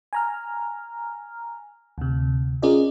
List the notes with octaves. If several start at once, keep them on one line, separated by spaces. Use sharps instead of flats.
G#5 A#5 F6
D2 C3
C#4 F4 G#4 A#4 D5 D#5